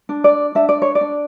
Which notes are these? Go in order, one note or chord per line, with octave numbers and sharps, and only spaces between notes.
D4
D5
D4 E5
D5
C#5
D5
D4